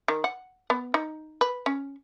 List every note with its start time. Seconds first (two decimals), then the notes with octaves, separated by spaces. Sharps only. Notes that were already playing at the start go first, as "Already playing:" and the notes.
0.08 D#3
0.24 F#5
0.70 B3
0.94 D#4
1.41 B4
1.66 C#4